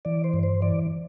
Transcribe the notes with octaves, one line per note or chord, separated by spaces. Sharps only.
E3 D5
C5
G2
C5
E3 D5